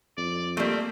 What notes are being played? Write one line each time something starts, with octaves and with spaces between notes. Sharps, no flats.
F2 D5
G3 A3 A#3 C4